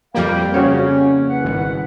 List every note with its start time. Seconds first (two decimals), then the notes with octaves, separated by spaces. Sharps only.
0.15 F2 G3 A#3 F5 G5
0.54 C#3 C#4 F#4 C#5
1.30 C2 B4 F#5
1.44 G#1